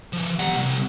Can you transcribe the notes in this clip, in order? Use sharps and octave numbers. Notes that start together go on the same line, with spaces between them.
F3 B4
G3 F#5
C3 G3